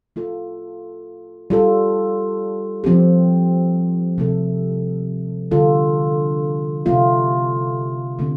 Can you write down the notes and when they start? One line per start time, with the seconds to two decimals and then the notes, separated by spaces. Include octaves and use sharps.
0.16 A3 F4 A4
1.50 G3 F4 A4
2.84 F3 C4 G4
4.18 C3 A3 C4 A4
5.51 D3 G3 F4 A4
6.86 C3 A3 F4
8.19 D3 A3 C4